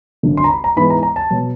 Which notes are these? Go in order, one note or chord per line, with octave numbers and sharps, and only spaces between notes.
G#1 F#2 D3
C6
A#5
B5
A#5
G#2 E3 G#3 B3 B5
A#5
A#5
A5
B2 F#3